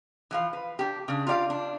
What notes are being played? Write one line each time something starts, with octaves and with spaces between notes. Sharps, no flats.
E3 F3 F5
B4
D4 G4
C#3 D4
F4 G4 D5 F5
D4